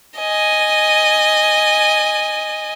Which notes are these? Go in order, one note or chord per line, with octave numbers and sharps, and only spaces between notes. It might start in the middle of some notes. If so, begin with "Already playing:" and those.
D#5 G#5